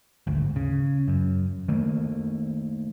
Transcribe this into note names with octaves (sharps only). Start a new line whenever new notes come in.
G#1 D2
C#3
F#2
D#3 A3 A#3